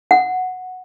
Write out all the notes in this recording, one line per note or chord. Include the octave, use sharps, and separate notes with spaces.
F#5